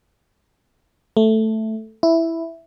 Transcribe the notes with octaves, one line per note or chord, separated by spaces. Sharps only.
A3
E4